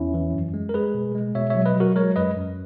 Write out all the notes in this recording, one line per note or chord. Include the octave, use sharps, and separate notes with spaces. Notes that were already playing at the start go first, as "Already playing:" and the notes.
Already playing: E2 C#4 E4
E3
F#2
G#3
A#4
G#3 G#4 B4
B2
G#3
B2 C#5 E5
C#5 E5
F#3
B4 D#5
F#3 F#4 A#4
G#3 A#4 C#5
F#2 B4 D#5
F#2